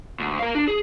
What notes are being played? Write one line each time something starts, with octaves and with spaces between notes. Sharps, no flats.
D2
A#4 F5
D4
G#4